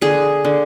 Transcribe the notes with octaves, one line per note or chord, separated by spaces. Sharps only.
D3 G#4
D3